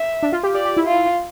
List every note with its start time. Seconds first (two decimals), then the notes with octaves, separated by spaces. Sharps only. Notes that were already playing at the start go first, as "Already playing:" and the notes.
Already playing: E5
0.23 D4
0.32 F4
0.43 G4
0.55 G4 D5
0.65 G4
0.77 E4
0.87 F4